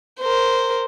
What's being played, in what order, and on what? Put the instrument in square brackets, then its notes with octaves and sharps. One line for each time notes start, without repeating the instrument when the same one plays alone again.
[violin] A#4 C5